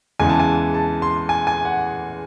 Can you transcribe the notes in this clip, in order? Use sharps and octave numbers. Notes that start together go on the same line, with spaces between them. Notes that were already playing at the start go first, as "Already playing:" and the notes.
E2 C#3 E3 G#3 G#5
A5
G#5
A5
C6
G#5
G#5
F#5